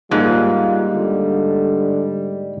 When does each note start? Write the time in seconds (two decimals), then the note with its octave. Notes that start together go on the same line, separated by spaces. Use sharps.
0.11 G#2 G3 G#3 A#3 F4
0.93 D3